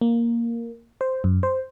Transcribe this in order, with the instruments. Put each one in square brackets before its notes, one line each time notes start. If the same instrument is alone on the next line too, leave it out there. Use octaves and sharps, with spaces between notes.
[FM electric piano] A#3
C5
F#2
C5